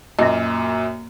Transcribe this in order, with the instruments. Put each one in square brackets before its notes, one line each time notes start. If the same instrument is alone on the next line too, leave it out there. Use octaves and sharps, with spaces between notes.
[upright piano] F#2 A#2 [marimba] A#3 D#5